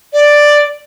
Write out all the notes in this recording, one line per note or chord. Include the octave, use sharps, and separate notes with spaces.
D5